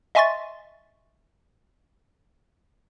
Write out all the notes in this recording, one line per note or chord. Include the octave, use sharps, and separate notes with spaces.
D#5 E5 G#5 C6 C#6 A6